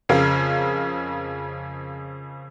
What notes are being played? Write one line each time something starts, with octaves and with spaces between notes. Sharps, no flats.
F2 C#3 A#4 F5